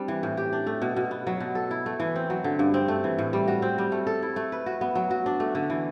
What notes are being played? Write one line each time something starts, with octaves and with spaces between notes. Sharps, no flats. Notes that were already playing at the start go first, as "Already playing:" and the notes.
Already playing: G3 C4 D4
E3
A2
G4
D4
A3
B2
B2
B3
F#3
B2
A4
E4
A3
E3
C4
F#3
D3
G2
C4
A3
E3
A2
G3
F#4
C4
G3
A3
A4
E4
A3
B4
F#4
B3
F#3
F#4
D4
A3
D3
E3